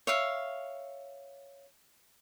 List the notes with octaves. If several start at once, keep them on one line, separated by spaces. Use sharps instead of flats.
C#5 E5 F5